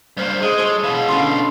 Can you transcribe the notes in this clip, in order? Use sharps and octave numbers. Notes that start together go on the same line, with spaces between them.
G2 A#3 C5
G#3 G#4 G#5
A4 C#5
B2 E3 F5
D3 C#4 D5 C6